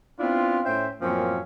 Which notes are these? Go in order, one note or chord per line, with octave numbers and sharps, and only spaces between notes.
B3 C4 D4 E4 F4
A2 C#4 C5 E5 G5
F#2 A2 F3 A#3 C4 C#4